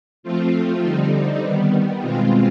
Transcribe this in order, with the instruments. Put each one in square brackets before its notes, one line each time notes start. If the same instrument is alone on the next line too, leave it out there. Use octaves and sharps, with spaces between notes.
[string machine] F3 A3 C4 F4
D3 G3 C4 D#4
D#3 G3 B3
B2 G#3 C4 F4